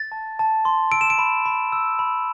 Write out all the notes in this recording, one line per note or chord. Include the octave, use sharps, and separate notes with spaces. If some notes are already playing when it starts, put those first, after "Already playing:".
Already playing: A6
A5
A5
C6
E6 D7
E7
D7
B5
B5
E6
B5